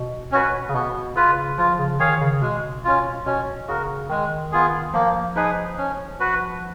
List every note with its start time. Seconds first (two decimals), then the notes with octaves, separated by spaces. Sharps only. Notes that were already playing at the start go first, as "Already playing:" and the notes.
Already playing: B2
0.32 C#4 F#4 B4
0.69 C#3
0.74 B2 B3
1.16 C#3 F4 B4
1.58 F3 F4
1.79 C#3
1.99 D#3 G#4 C#5 F5
2.21 C#3
2.41 B2 G#3
2.84 C#4 F4
3.26 B2 C#4
3.68 C#3 F#4 A#4
4.10 D#3 G#3
4.52 B3 F4 G#4
4.94 F3 A#3
5.36 F3 D#4 G#4 B4
5.78 C#4
6.20 F#4 B4